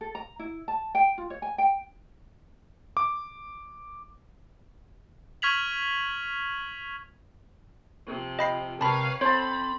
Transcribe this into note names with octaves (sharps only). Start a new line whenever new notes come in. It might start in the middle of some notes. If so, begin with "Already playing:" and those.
A4
A#5
E4
A5
G5
F4
C#5
G#5
G5
D6
C#6 F6 G#6 B6 F7 F#7
C3 F3
D#5 G5 B5 C7
C3 A#4 B4 C#5 F5 A5 B5
C4 A4 C5 C#5 A5 B5